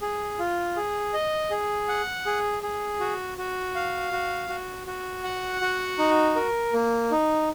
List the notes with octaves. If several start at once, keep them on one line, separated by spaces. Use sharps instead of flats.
G#4
F4
G#4
D#5
G#4
F#5
G#4
G#4
F#4
F#4
F5
F#4
F#4
F#4
F#5
F#4
D#4
A#4
A#3
D#4